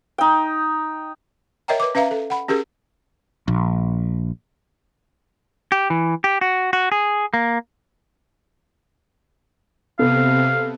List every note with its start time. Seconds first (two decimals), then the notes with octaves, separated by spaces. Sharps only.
0.18 D#4 G5
1.68 A#4 C#5 D#5 E5 G5 A#5
1.80 B4 D6
1.95 C#4 B4 E5 F5 A#5
2.11 A4
2.30 F#5 B5
2.48 C#4 G4 G#4 A#4
3.48 A#1
5.72 G4
5.90 E3
6.24 G4
6.41 F#4
6.73 F#4
6.92 G#4
7.34 A#3
9.99 C3 B3 A4 F5